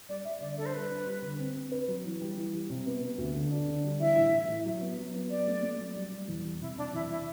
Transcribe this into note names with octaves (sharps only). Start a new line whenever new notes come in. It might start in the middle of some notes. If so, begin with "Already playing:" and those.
G3 D5
G3 E5
D3 D5
D4 A4
C5
G3 B4
D4
G3
D3
C4
C4
B4
F#3
E3
G3
E3
G3
C3
B3
B3
D2
D3
D4
D3
G3
E3 E5
A2
E3
A2
F#3
B3
F#3
B3
F#3 D5
A3
A3
F#3
G3
G3
E2
G3
C3 E4
C3 D4
E2 E4
E4